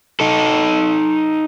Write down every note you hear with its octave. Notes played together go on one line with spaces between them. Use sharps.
D#4 A4